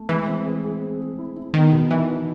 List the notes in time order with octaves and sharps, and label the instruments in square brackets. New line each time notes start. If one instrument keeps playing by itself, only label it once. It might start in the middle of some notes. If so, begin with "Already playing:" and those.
Already playing: [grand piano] A3
[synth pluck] E3 [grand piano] G#3
[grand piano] C4
G#4
G#4
C4
G#4
E4
E4
[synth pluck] D#3 [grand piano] B3
[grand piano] B2
[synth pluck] E3 [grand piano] D#4
[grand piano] B3